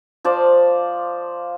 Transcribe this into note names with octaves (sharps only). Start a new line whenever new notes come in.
F3 C5 D5